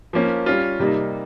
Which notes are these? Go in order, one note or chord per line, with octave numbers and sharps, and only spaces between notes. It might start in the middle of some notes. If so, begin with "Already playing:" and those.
F3 A#3 C#4
G3 C#4 F4
C3 G3 A#3 D#4